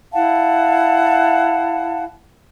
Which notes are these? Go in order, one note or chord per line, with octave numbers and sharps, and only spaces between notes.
E4 F5 F#5 A5